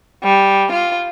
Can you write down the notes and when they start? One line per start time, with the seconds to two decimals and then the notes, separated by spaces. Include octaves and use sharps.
0.24 G3
0.73 F4